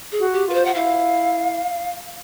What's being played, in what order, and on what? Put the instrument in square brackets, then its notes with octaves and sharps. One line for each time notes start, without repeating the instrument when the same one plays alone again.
[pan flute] G#4
[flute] F#4
[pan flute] G4
[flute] F4 [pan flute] B4
[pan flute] C5
F#5
[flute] E4 [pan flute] F5